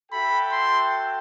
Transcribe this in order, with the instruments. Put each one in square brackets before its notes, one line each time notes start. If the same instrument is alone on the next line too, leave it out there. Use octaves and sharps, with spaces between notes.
[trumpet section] F#4 A4 E5 G5 [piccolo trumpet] B5
[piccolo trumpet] C6